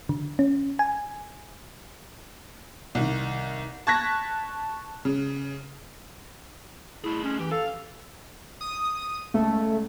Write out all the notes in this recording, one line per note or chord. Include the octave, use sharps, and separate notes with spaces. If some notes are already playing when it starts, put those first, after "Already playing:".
D3
C#4
G#5
C2 D#3
A5 C#6 F#6 G#6 A#6 B6
C#3
A3 E4 G#4
C#4
E3 G4
A4 F5
D#6
C#2 A3